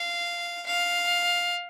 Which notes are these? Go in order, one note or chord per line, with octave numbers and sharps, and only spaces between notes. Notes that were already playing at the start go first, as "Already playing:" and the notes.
Already playing: F5
F5